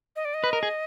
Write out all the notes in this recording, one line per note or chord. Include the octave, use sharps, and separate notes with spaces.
D#5
D5
D#5
B4
A#4
G#4